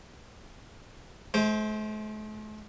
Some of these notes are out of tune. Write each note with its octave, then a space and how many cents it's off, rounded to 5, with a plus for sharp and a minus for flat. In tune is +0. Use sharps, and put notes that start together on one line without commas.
A3 -45 C5 +0